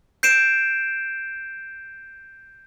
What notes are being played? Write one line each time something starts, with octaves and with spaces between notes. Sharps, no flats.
G6 C7 D7 E7